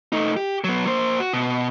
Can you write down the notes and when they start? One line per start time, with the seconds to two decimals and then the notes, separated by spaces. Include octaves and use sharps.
0.13 A3 D#4
0.37 G4
0.64 F#3 B3
0.86 A#3 C5
1.20 F#4
1.33 B2